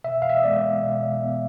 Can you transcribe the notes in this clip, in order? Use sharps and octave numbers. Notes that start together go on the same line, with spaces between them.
B2 E5
F5
E5
D#5
G#3 B3 D5
B2
G#3 B3